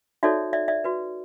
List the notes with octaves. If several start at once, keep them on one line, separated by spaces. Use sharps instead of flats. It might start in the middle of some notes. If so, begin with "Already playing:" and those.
D#4 F#4 A4 C#5 D5 E5
D5 E5
D5 E5
F#4 B4